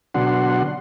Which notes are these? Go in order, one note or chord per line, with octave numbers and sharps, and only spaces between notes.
B2 D3 F#3 D4 F#5 C6